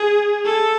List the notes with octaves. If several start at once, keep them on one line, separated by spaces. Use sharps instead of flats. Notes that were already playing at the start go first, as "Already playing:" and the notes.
Already playing: G#4
A4